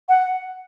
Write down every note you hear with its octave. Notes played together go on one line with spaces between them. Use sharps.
F#5